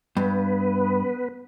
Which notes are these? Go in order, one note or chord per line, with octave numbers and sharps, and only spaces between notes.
G2 B3 B4